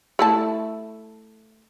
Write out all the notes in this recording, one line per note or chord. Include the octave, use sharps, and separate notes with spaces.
A3 E4 A5